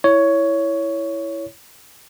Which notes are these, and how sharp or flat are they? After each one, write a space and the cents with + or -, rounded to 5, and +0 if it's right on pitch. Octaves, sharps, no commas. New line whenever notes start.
E4 +0 C#5 +10